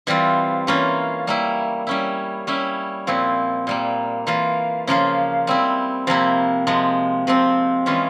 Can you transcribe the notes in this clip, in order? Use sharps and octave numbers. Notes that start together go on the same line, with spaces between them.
E3 G3 C4 F4
E3 A#3 C#4 F4
G3 A#3 E4
G3 C#4 E4
G3 C#4 E4
A#2 F3 C4 E4
A#2 G3 A#3
E3 A#3 F4
C#3 F3 A#3 F4
G3 C4 E4
C3 F3 A#3 E4
C3 F3 G#3
C3 F3 C4
E3 G#3 C#4 F4